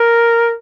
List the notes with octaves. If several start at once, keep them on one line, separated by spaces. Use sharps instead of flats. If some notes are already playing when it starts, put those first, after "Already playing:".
Already playing: A#4